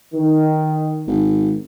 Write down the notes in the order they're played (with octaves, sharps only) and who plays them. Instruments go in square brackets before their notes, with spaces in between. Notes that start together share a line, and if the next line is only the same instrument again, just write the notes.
[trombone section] D#3
[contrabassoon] G#1